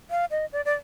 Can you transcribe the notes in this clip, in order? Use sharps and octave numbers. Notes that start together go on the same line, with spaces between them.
F5
D#5
D5
D5